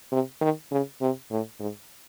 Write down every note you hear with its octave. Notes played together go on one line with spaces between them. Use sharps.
C3
D#3
C#3
C3
A2
G#2